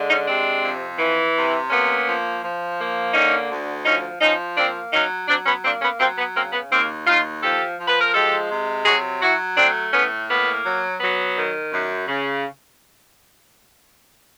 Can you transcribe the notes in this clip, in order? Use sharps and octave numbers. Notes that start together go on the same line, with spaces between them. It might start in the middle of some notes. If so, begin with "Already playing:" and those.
Already playing: D3 G#3
C#4 D#4
C3 C4 D4
F2
E3
C3
A#3 B3 C#4
F3
F3
A#3
D3 C#4 D#4
D2
F3 C#4 D#4
F3 C#4 D#4
A#3 C4 D4
F#3 C#4 D#4
F#3 C4 D4
B3 C#4
A#3 C4 D4
B3 C#4
F#3 A#3 C4
B3
C#3 A#3 C4
B3
D#2 A#3 C4
D#2 D#4 F4
F3 G4 A4
F3
B4
A#4
G#3 G4 A4
C3
F#3 F#4 G#4
F#3 E4 F#4
A3 C4 D4
A2 B3 C#4
A#3 B3
F#3
F#3 B3
D#3
F#2
C#3